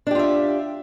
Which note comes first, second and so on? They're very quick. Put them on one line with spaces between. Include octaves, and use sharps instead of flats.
D4 G4 F4 E5